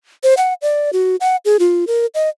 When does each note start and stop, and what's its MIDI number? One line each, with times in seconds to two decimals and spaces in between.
0.23 0.34 72
0.37 0.54 78
0.62 0.90 74
0.93 1.16 66
1.21 1.36 78
1.45 1.57 68
1.59 1.85 65
1.87 2.06 70
2.15 2.29 75